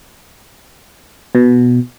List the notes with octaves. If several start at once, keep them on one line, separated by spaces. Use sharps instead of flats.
B2